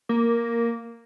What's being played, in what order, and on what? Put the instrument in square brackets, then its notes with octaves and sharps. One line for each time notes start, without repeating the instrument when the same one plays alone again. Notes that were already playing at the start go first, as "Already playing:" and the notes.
[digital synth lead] A#3